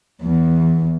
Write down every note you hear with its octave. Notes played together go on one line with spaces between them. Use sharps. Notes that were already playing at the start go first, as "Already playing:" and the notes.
E2